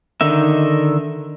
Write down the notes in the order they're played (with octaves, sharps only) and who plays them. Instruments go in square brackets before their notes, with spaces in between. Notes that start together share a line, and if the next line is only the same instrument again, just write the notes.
[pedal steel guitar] D3 D#3 D#4 E5